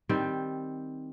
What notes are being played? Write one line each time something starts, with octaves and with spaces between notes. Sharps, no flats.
D#3 G3 C4